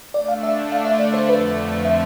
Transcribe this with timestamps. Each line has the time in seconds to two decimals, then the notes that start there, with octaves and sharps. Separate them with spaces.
0.14 D3 A3 D4 D5
0.28 F5
0.43 E5
0.72 F5
0.85 E5
0.99 D5
1.14 C5
1.28 F2 D3 F3 A3 B4
1.85 E5